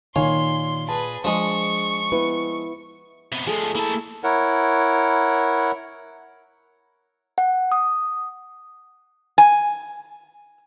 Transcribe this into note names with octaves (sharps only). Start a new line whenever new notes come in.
A#2 D#3 C#5 F5 G#5 C6
G#4 B4 A5
F3 G#3 D4 G#4 C#6
B3 E4 B4
C3 B3
F3 G#3 A3 G#4
A#3 E4 A5
E4 A#4 C#5 F#5
F#5
D#6
G#5